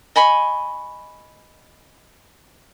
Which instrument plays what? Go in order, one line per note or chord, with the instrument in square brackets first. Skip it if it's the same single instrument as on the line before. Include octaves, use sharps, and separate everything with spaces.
[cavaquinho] D#5 G#5 B5 C#6